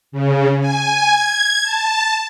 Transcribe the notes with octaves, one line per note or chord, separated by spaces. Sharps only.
C#3
G#5
G#6
A5